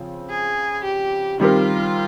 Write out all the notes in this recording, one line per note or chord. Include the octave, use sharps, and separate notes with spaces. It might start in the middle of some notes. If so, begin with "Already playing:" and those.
Already playing: C#3 F3 C4
G#4
G4
D#3 G3 C4 F4 G4 A#4